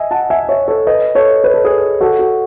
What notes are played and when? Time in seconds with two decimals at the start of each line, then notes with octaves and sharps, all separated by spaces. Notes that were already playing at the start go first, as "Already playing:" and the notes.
Already playing: D#5 E5 G#5
0.11 F#5 A5
0.30 E5 G#5
0.49 C#5 E5
0.68 A4 C#5
0.87 B4 D#5
1.15 A4 C#5
1.44 B4
1.54 A4
1.64 G#4 B4
2.01 F#4 A4
2.19 F#4